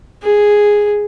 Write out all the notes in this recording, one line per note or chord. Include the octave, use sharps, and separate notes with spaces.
G#4